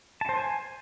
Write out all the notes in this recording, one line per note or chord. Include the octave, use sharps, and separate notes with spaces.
A5
C5
G#5